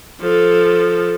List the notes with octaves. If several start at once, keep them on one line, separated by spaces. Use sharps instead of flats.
F3 A4